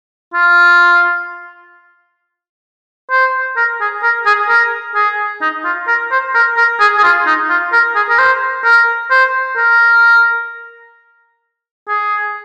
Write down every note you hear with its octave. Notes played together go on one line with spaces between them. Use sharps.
F4
C5
A#4
G#4
A#4
G#4
A#4
G#4
D#4
F4
A#4
C5
A#4
A#4
G#4
G#4
F4
D#4
F4
A#4
G#4
A#4
C5
A#4
C5
A#4
G#4